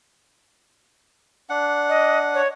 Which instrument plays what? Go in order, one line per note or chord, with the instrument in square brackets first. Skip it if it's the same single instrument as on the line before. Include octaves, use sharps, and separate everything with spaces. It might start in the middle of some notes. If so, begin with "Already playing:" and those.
[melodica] D4 F#5
[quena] D#5
C#5